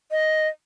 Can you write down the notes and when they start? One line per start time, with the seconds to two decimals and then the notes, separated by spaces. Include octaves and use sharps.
0.11 D#5